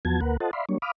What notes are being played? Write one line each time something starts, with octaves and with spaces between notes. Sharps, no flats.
E2 F3 B3 F#4 A5 G#6
D2 A#3 A#4 B4 F#5
F4 A4 C5 D#5 F#5 A5
D5 E5 F5 B5 C6
F#3 G3 A#3 D4 C#5
F5 B5 D6 D#6 F6